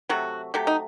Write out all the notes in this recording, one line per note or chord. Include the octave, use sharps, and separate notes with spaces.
C3 F#3 A3 F#4
C3 F#3 A3 G4
D#4